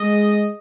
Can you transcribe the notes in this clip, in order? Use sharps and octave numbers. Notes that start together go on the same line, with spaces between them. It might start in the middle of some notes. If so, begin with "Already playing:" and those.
Already playing: G#3 D#5